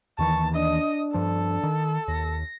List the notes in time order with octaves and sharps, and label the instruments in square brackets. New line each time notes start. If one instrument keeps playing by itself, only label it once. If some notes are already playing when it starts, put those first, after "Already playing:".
[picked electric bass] D#2 D#3 E3 [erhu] A5 [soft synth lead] C#6
[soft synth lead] D4 [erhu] D#5
[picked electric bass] G2 F3 [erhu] A4
[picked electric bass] D#3
[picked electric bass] D#2 [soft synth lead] A#6